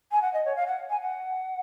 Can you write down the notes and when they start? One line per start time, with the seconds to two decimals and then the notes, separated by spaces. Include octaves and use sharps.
0.11 G#5
0.22 F#5
0.33 D#5
0.45 C#5
0.56 F5
0.67 F#5
0.90 G#5
1.02 F#5